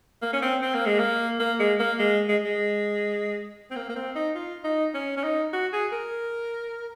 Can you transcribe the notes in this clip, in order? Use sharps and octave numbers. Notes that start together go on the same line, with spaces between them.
A#3
C#4
C4
C4
A#3
G#3
A#3
A#3
G#3
A#3
G#3
G#3
G#3
C4
A#3
A#3
C4
D#4
F4
D#4
C#4
C#4
D#4
F#4
G#4
A#4